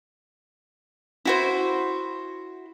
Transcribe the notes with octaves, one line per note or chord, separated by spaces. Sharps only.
E4 F#4 C5